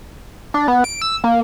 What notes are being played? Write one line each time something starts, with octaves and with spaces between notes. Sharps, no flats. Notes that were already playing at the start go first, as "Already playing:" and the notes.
D4
B3
D7
E6
A#3